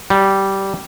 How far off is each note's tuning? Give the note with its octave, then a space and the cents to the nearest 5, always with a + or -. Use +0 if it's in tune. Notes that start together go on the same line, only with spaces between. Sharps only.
G3 -10